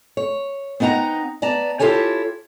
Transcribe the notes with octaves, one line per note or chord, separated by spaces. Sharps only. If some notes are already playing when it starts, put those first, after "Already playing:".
C#5
B3 C4 D#4 F#5 A#5
B3 D5 A5 A#5
E4 F4 G4 A4 C#5 G#5